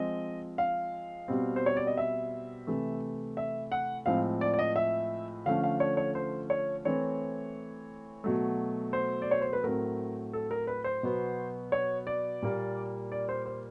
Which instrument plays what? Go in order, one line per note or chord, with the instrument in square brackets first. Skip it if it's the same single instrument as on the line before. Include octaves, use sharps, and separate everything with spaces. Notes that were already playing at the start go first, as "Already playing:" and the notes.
Already playing: [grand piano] F3 G#3 C4 D#5
F5
B2 G3 C4
C5
C#5
D5
D#5
E5
C3 E3 A3
E5
F#5
A2 F3 G#3 C4 F5
D5
D5
D#5
E5
D3 F3 A3 C#4 F5
F5
C#5
C#5
C5
C#5
E3 A3 C4 C#5
B2 F#3 A3
C5
D5
C#5
C5
B4
A2 F#3 A3 C4 A#4
A4
A#4
B4
C5
B2 F#3 B3
C#5
D5
A#2 G3 A#3
D5
C5
C5